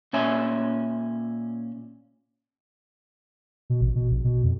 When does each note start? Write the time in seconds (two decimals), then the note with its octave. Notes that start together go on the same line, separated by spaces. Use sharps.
0.13 A#2 C#4 E5 G#5
3.70 B2
3.81 A1
3.95 B2
4.11 A#1
4.24 B2
4.44 F2